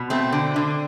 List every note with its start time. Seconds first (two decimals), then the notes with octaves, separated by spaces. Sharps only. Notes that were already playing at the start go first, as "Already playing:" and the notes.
Already playing: B2
0.10 A3 C4
0.33 D3
0.56 D3